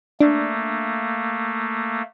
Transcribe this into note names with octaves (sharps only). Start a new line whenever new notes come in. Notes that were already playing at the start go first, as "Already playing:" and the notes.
A3 A#3 D4